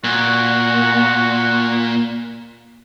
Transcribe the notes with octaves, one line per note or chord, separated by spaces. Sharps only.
A#2 F#4